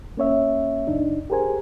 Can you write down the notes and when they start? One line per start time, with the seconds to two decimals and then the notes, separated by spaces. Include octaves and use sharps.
0.17 A#3 C#4 C#5 E5
0.87 C#2 F#2 D4 D#4
1.30 G4 G#4 A#4 C5 G#5